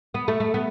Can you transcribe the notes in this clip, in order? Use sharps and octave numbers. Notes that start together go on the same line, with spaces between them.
B3
A3
A3
B3